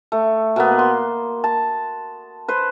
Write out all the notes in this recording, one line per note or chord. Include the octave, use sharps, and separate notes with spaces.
A3
B2 A#3 B3
C6
A5
B4 C5